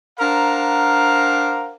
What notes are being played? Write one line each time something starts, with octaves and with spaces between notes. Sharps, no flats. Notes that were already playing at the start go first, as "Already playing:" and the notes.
D4 A#4 C5 F5 F#5 A#5